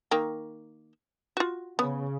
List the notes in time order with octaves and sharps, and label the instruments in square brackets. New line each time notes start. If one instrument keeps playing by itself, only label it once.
[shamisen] D#3 A#3 G5
F4 F#4
[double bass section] C#3 [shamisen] B3